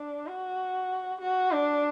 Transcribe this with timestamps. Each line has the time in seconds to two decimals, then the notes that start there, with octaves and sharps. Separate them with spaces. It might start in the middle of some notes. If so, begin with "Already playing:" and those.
Already playing: D4
0.27 F#4
1.21 F#4
1.52 D4